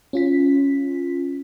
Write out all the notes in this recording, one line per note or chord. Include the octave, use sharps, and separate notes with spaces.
C#4 F4 B6